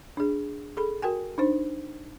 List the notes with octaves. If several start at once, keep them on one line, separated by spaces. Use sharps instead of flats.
D4 G#4
G#4 A4 B5
F#4 A#4 G5 G#5
D4 D#4 C5